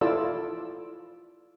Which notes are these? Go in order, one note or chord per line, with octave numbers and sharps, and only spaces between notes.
E4 F4 A4 D5 E6